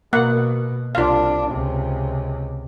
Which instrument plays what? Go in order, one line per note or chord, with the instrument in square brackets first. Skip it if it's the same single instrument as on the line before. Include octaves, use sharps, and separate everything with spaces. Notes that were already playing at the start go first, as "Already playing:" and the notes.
[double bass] B2 [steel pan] A#3 F#5
[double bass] C2 D4 [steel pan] F4 F5
[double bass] C#2 C3